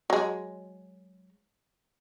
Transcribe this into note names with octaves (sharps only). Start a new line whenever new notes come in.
F#3 G#3